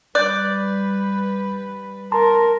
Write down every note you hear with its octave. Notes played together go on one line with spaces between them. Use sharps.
G3 B4 D5 F#6 G6
A#4 A5 A#5 C6